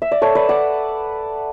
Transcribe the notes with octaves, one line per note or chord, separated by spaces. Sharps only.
E5
D5
A4 C#5
B4 D5
D5 F#5